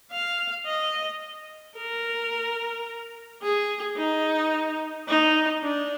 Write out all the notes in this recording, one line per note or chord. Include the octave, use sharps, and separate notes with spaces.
F5
D#5
A#4
G#4
D#4
D#4
D4